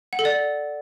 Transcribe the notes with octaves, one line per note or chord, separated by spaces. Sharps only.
F#5
A4
D5